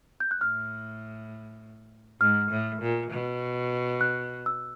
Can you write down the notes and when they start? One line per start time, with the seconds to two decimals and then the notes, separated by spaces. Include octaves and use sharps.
0.20 G6
0.31 F#6
0.41 A2 F6
2.21 G#2 F6
2.51 A2
2.82 A#2
3.11 B2
4.01 F#6
4.46 E6